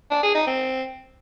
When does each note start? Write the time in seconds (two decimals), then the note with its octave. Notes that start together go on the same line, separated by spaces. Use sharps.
0.11 D4
0.23 G#4
0.35 D#4
0.47 C4